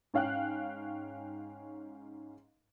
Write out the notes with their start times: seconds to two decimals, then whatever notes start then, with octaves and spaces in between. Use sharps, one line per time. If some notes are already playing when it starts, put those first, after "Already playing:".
0.14 G#2 C#4 F5 G5 F#6